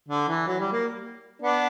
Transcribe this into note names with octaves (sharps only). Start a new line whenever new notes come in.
D3
E3
F#3
G3
A#3
B3 D4